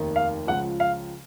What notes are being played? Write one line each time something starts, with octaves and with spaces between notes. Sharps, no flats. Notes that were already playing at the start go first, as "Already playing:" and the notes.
Already playing: F1 D#2 D#3
F5
C#2 C#3 F3 F#5
F5